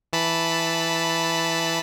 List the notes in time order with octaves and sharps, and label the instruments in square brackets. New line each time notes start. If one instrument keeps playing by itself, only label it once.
[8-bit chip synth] E3 A5 B5